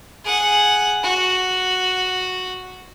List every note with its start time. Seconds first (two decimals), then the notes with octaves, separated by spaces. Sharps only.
0.24 G#4 F#5
1.03 F#4